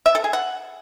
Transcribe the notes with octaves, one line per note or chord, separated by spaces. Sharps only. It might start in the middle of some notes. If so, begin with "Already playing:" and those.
E5
A4
G#4
F#5